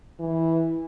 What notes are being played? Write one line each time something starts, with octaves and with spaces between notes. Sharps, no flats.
E3